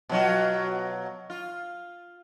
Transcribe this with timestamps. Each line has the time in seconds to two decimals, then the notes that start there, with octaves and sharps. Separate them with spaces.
0.09 B2 F#3 F4
1.30 F4